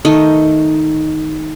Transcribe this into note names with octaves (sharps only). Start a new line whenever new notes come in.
D#3 A3 D#4 D#5